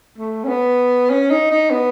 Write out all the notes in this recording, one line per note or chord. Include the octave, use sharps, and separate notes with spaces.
A3
C#4
B3
C#4
D#4
D#4
B3